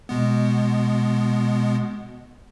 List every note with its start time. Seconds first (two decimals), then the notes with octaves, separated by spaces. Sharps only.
0.09 B2 G#3 B3